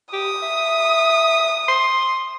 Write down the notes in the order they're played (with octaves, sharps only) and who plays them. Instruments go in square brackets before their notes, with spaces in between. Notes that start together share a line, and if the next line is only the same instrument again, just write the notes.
[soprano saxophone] G4 [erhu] D#6
[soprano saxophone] E5
C6